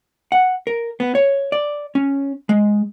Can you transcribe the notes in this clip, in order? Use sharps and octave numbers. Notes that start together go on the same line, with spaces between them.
F#5
A#4
B3
C#5
D5
C#4
G#3